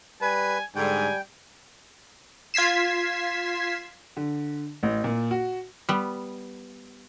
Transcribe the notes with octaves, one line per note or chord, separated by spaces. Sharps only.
G3 B4 G#5
G#2 D3 G3 G5 G#5
F4 G#6 B6 C7 E7
D3
A1
A#2
F#4
G3 B3